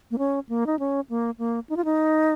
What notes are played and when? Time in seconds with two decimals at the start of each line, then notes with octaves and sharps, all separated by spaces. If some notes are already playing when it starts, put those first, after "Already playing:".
0.11 A#3
0.18 C#4
0.49 A#3
0.67 D#4
0.79 C#4
1.10 A#3
1.39 A#3
1.69 D#4
1.77 F4
1.85 D#4